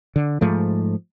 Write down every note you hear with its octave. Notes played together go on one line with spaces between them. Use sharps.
D3
G#2 F3 A3